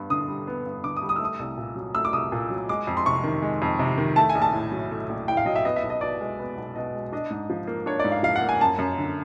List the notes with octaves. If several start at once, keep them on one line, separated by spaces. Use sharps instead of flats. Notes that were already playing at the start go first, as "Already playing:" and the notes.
Already playing: G2 B3
D3 D#6
G3
B3
G2
D3 D6
D#6
G3
D#6
E6
A3 D#6
C2
A#2
F#3
A3 E6
D6
C2 D#6
A#2
F#3
G#3 D6
F2
C6
C3 C#6
D#3
G#3
F2
C3
D#3
A3 A5
G#5
A#1
A5
A2
F#3
A3
A#1
A2 G5
F5
F#3 D#5
E5
B3 D#5
E5
B1
D#5
B2 D5
G#3
B3
B1
B2 D#5
G#3
D4 D#5
G#2
F3
A#3
D4 C#5
D5
G#2
F5
F3 F5
F#5
A#3
G#5
F#2 A5
F#2
D3